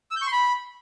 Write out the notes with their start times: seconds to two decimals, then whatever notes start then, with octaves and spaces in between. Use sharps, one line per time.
0.11 E6
0.16 G6
0.22 C#6
0.27 C6
0.32 B5